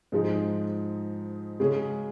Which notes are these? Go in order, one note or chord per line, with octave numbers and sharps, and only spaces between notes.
G#2 F3 G#3 D#4
C#3 G#3 C#4 G#4